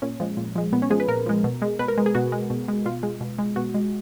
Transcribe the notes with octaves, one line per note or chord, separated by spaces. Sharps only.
A#2 C#4
F3 G#3
A#2
F3 G#3
A#2 B3
C#4
F3 G#3 G#4
B4
A#2 A#4
F3 G#3
B2
G#3
B2 B4
A#4
G#3
G#4
B2 F#4
G#3
B2
G#3
B2 F4
G#3
B2
G#3
B2 F#4
G#3